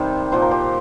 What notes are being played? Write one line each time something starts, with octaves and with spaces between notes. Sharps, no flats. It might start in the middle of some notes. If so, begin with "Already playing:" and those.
Already playing: C3 D#3 G3 G4 C5
A#2 F3 C5
A#4
G4 C5